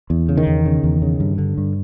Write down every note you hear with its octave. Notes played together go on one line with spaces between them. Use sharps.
E2
C#3
D#3
E2
C#3
E2
C#3
G2
D3
G2